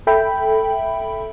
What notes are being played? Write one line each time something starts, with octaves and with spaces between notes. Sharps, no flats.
A4 E5 G5 B5